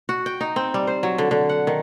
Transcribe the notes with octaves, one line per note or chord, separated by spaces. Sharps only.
F#4
G5
D#4
C4
G3
C5
F#3
D3
D3
F#5
D#3